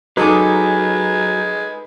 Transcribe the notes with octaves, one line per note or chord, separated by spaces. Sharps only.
F#3 G#3 D#4 A4 B4 G#5 D6